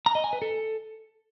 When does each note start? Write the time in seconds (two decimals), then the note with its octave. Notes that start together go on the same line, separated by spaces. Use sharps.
0.06 A#5
0.15 D#5
0.24 G#5
0.33 B4
0.42 A4